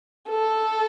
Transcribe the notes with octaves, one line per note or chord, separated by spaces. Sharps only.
A4